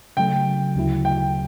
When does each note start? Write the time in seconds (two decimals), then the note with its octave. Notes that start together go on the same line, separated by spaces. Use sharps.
0.17 C#3 F#3 A3 G5
0.76 D2 C#3 F#3 A3 E4
1.05 G5